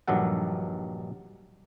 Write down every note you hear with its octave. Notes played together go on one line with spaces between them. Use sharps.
A#1 G2 D#3 F#3 A4 F#5